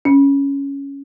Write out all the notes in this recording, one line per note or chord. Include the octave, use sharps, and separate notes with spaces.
C#4